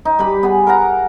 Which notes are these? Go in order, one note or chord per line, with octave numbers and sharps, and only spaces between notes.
D#4
G3 B4 B5 D6
B3 G#4
A#4 F5 F#5 A#5